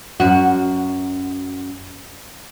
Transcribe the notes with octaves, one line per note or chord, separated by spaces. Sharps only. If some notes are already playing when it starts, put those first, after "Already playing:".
F#2 F#4